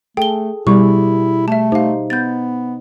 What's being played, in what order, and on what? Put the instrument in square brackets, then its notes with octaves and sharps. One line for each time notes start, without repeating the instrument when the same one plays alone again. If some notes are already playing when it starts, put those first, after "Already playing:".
[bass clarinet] A3 [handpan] G#4 A4 [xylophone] G5 G7
[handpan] B2 G#4 [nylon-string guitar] G3 [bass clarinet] E4 [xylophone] C#6
[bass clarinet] A3 [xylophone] E5 A5
[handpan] D#4 C5 [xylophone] G4 F5
[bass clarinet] B3 [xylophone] G6 A6